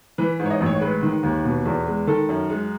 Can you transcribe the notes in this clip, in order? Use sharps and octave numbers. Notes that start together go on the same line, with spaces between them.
E3 B4
G#2
C#5
D#5
A1
C#5
G#3 B4
D#3
D#2
B2
E2
G#3
D#3 A4
F#2
G#3